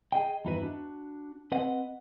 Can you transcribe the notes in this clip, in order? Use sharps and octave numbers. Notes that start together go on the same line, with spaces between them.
G#4 D#5 G5
E2 G2 D#4 E4 F#4 B4
D4 F#4
C4 B4 D#5 F#5